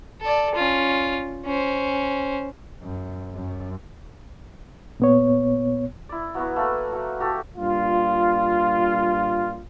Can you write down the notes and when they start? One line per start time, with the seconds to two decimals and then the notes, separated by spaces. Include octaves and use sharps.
0.21 A4 D5
0.55 C#4 F4
1.45 C#4 C5
2.83 F#2
3.35 F#2
5.00 A#2 B3 C#5
6.09 E4 D5
6.35 F#3 B3 E4 F#4
6.56 A3 A#3 A4 B4
6.92 F#3
7.20 F#4 G4 A4
7.56 G2 A#2 F4